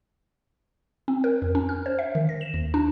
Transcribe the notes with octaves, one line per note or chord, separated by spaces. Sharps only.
C4
A#4
F2
C#4
F6
C5
E5
D#3
A#6
E7
D#2
D4